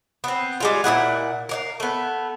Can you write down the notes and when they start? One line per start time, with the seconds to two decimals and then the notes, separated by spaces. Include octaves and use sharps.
0.24 B3 C4
0.60 G3 G#3 F4
0.84 A#2 D#4 E4 F#5
1.49 A#4 D5 F5
1.80 A3 B3